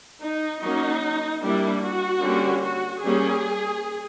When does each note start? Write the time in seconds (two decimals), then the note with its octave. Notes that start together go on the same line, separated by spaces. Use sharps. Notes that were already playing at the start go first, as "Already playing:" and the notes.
0.22 D#4
0.62 F#3 A#3 C#4 D#4
1.42 G3 A#3 D4 E4
1.82 F#4
2.22 D3 G3 A#3 C#4
2.62 F#4
3.02 G3 A#3 C#4 G#4